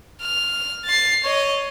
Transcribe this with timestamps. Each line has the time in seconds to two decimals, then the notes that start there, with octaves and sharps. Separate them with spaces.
0.21 F6
0.85 A6 C7
1.24 C#5 D#5